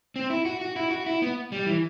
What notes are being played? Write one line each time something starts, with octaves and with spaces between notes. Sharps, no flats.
C4
E4
F#4
F#4
E4
F#4
E4
B3
G3
E3